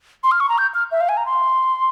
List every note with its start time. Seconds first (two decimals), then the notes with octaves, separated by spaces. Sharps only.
0.24 C6
0.31 F6
0.40 C#6
0.49 A#5
0.58 G6
0.74 F6
0.92 E5
1.01 F5
1.09 G#5
1.17 A#5
1.26 C6